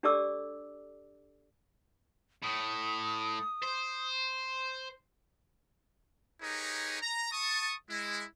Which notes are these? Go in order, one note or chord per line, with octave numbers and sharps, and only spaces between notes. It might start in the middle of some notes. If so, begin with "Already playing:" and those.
D4 G4 A4 D5 D6 E6
A2 D#6
C5
D#4 G4 G#4 A#4 B4 C#5
A#5
A5 C#6 D#6
G#3 E4